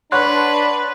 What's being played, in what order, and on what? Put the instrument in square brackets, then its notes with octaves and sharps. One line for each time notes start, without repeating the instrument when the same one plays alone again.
[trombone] D4 [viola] B4 [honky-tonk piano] C#5 F#5 B5 [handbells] C6 F#6